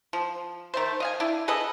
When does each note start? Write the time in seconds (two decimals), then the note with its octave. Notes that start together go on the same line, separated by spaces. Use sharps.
0.13 F3
0.74 D#3 A3 C5
1.00 D#5 F5 G#5
1.20 D4 E4
1.48 G#4 A4 B4 D#5